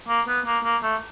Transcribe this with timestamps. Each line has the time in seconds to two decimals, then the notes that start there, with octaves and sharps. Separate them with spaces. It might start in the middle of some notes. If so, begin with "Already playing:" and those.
0.08 A#3
0.27 B3
0.46 A#3
0.64 A#3
0.83 A3